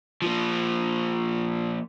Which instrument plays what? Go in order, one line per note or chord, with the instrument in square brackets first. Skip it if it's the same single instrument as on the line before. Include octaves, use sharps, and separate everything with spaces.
[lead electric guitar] F3 A#3